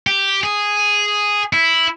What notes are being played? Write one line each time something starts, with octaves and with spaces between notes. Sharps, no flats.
G4
G#4
E4